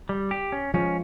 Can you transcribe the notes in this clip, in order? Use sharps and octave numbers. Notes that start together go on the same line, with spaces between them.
G3
G4
C#4
F3 G#3 C#4